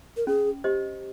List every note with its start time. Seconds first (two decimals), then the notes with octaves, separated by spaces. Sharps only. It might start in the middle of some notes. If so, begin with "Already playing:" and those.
0.17 A#4
0.27 C#4 G#4
0.64 G4 C5 D#5